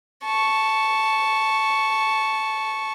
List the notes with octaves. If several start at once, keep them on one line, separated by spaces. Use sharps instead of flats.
A5 C#6